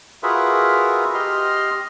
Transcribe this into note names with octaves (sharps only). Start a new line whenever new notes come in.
F4 F#4 G#4 A#4 B4 E5
G4 D#5 C6 F6